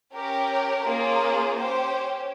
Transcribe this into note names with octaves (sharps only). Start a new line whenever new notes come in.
C#4 G4 A#4
A#3 C#4 F4 G#4
C#4 G4 C5